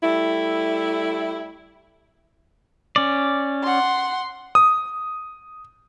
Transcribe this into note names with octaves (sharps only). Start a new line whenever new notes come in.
G3 A3 E4
C#4 D5
F#5 C6
D#6